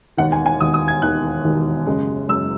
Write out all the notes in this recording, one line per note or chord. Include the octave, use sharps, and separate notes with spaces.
E1 D#2 D#3 F#5
G#5
G#5
E1 D#2 D#3 D#6
D#6
G#6
E1 D#2 D#3 F#6
E1 D#2 D#3
F#2 C#3 G#3
F#2 C#3 G#3 E6